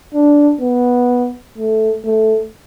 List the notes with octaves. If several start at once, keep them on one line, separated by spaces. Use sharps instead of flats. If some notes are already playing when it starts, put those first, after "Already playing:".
D4
B3
A3
A3